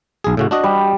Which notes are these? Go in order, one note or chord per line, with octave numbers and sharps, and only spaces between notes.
B1 G#4
A2 C#3 F#4
D4 F#4 D#5
G3